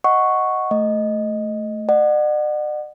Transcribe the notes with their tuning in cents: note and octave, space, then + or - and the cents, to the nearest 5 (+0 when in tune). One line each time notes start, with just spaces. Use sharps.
D#5 +0 F#5 +0 C#6 +0
A3 -5 D#5 +0
D5 +45 F#5 +0